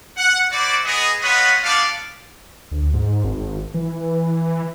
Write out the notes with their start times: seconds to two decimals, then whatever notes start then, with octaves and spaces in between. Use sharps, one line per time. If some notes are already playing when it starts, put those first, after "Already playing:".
0.16 F#5
0.52 E4 F#4 C5 D5
0.84 B3 G#4 D#5
1.21 B3 F4 C#5 D#5 F#5 B5
1.62 G3 B3 D4 F4 D5 F5
2.71 D2
2.94 G#2
3.24 G#1
3.74 E3